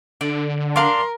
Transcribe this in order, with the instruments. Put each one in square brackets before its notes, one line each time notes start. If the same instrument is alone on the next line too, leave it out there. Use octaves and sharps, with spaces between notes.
[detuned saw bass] D3 [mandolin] D5
[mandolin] D4 F5 D6 [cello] A#4 [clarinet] C6